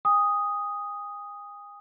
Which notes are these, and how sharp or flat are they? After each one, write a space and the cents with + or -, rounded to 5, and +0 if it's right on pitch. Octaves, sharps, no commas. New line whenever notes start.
G#5 -40 D#6 +0